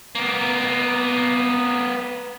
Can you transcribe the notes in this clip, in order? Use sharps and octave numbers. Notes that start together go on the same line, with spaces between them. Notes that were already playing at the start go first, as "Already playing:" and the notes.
A#3 B3